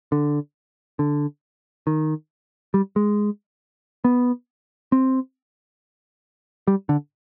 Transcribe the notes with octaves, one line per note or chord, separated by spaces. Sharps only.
D3
D3
D#3
G3
G#3
B3
C4
G3
D3